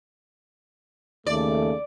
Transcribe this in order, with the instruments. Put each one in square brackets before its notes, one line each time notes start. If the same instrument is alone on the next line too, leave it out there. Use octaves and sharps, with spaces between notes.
[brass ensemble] D#2 C#3 A3 [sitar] D5